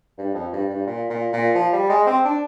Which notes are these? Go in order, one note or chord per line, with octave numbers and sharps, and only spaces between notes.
G2
F2
G2
G2
A#2
A#2
A#2
F3
G3
G#3
C4
D4